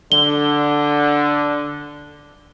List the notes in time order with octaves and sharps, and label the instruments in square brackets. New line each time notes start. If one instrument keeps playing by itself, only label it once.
[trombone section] D3 [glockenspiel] G7